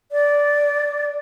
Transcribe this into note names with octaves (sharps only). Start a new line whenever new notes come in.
D5